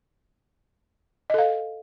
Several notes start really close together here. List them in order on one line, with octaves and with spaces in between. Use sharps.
D#5 A4 F5